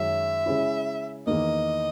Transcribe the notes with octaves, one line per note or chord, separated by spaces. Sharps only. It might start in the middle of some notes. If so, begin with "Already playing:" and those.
Already playing: F#2 D#3 G#3 C#4 E5
C#3 G#3 C#4 E4
E2 D#3 A#3 D#5